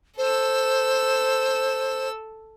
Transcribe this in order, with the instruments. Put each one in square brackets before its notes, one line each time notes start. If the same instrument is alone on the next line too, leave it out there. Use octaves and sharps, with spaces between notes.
[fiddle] A4 E6 [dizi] C5